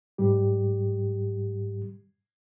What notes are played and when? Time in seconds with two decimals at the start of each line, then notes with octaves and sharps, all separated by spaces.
0.18 G#2 G3 G4